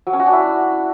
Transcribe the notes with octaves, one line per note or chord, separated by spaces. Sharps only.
F#3
C#4
F#4
D4
E4